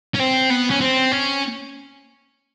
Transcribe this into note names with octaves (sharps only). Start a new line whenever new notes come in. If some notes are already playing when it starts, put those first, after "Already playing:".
C#4
C4
B3
C#4
C4
C#4